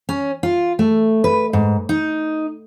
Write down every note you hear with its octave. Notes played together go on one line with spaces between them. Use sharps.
C#4
F4
A3
B4
G#2
D#4